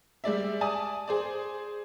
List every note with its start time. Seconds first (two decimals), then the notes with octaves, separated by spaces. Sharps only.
0.24 G3 G#3 D5 E5
0.61 D5 G#5 A5 D#6
1.08 G#4 C5 D5